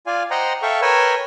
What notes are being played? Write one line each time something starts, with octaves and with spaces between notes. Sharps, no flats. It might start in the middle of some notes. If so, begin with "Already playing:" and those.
F4 D5 F5 G#5
C5 D#5 F#5 G5 A#5 C6
A4 E5 F5 G5 C#6
A#4 B4 C#5 G5 G#5 E6